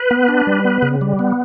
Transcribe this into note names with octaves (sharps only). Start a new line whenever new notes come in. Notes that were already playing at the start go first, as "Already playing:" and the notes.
Already playing: B4
B3
D4
G3
B3
C#3
G3
B3